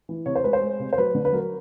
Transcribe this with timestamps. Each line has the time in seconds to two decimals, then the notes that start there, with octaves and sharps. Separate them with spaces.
0.09 E3
0.26 C3 C#5
0.36 C5
0.44 G#3 B4
0.53 C5
0.61 G#3
0.79 C3
0.93 C5
0.98 F#3 B4
1.15 D3
1.25 B4
1.32 F#3 A#4